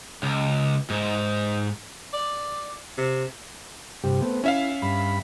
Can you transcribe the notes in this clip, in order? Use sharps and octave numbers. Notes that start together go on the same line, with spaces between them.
C#2
G#2
D5
C3
G2 C3 G4
A3 B3 C4
C#4 E4 E5 F5
G2 B5